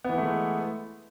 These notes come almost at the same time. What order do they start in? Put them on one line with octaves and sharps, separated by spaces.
B3 E3 E4 A3 G#3